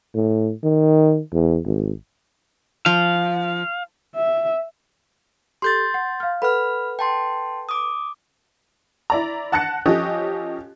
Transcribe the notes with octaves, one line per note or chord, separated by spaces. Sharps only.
A2
D#3
E2
G#1
F3 F5
E5
G4 A4 C6 G6 A6
F#5
F5 F6
A4 B4 F#5 B5 F6
G5 A5 C6
D6 D#6
E4 D5 A#5
F#5 A5 F#6 A#6 C#7
F3 C#4 G4 A4 D#5